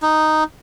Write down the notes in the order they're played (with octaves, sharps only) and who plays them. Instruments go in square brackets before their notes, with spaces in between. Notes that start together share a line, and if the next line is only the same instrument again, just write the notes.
[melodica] D#4